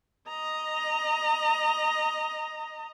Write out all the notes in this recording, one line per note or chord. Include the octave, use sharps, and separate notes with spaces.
D#5 A#5